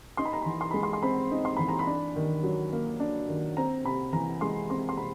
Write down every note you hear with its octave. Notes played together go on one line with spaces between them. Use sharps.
D#4 C6
B5
A#5
B5
E3
C6
G#3 B5
C6
C6
C4 B5
D#4
C6
E3 B5
A#5
B5
D4
D#3
F#3
A#3
D4
D#3
C4 A#5
C3 B5
E3 A#5
G#3 C6
C4 C6
C6
C3 B5